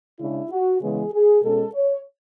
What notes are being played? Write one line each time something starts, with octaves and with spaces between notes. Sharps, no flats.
C#3 G#3 D4 E4
F#4
C#3 E3 G#3 B3 G#4
G#4
B2 G#3 C#4 A4
C#5